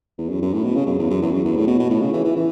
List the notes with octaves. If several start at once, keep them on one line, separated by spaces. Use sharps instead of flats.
E2
F#2
F#2
A2
B2
C#3
F#2
E2
F#2
E2
F#2
E2
A2
B2
B2
A2
C#3
E3
E3
E3